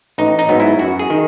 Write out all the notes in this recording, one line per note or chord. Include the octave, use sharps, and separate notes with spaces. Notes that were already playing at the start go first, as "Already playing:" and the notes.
A1 D#4
D#4
G#2 F#3 B3
E4
F#2 F#4
G#4
D#3